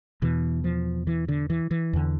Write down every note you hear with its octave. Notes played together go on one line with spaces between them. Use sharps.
E2 B2 E3
F3
E3
D3
E3
E3
E2 D3